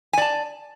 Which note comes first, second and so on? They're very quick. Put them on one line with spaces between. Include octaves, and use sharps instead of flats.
G#5 D5 A5